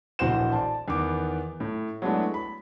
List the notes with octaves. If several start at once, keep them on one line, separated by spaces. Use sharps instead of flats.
D1 A#1 E3 F#4 C5 E7
D5 A5
E2 D#3 B3 D6
A2
F#3 G#3 A3 B3 D4 E4
B5